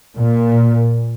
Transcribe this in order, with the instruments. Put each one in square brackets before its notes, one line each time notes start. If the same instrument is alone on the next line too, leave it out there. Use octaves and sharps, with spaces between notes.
[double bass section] A#2